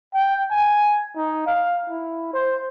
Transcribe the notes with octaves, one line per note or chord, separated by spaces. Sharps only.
G5
G#5
D#4
F5
E4
C5